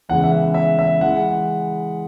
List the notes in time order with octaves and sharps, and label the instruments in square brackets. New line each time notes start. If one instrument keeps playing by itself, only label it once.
[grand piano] E2 C#3 E3 G#3 F#5
E5
F#5
E5
E5
E3 G#3 F#5